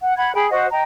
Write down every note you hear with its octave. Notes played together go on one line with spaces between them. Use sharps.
F#5
F#5 B5 G#6
G#4 G5 B5
F#4 C5 D#5 F#5
D#5 G5 A#5